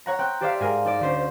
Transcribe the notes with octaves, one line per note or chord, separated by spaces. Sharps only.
C#5 F#5 A#5
C4 G5 F#6
G4 A4 C5 D5 E5 F5
G#2 G#4 A#4 F6
D#4 A4 D5
D2 C#4 C5 G6